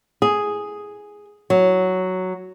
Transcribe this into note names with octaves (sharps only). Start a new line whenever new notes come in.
G#4
F#3